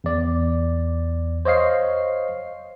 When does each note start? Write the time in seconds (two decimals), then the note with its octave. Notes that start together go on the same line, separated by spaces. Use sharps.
0.04 E2 D5
1.45 C5 C#5 D#5 F5 C7